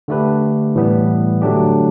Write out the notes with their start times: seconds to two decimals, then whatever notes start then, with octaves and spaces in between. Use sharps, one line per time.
0.08 D3 A3 D4 G4 B4
0.75 A2 E3 G3 B3
1.42 D3 F#3 A3 D4 G4